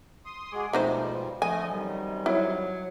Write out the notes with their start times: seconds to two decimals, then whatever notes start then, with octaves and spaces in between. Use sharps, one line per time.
0.25 C6 D#6
0.52 G#3 F#4 G#4 C6 D6
0.73 G#2 B2 F3 G3 A3 D#4 C5
1.42 D3 F3 A3 D#5 G#5
1.73 F#2 C3 D#3 G3
2.26 F#3 E4